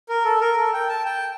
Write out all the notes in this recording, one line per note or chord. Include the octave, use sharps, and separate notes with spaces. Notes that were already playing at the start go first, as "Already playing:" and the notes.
A#4
A4
A#4
A4
G5
A5
G5